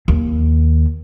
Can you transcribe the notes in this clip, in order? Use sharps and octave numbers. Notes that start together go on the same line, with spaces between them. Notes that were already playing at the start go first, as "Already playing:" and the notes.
D#2